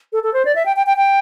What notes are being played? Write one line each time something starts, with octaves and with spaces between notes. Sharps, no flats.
A4
A4
C5
D5
E5
G5
G5
G5
G5